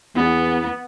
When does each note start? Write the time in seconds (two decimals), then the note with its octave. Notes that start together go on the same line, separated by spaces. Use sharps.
0.16 E2 B3